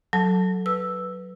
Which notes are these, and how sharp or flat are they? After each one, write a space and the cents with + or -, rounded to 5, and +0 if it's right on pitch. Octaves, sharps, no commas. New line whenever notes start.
F#3 +0 A4 +0 A5 +0
B4 +0 E6 +0